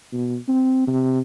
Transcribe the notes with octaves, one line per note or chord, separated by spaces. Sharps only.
B2
C4
C3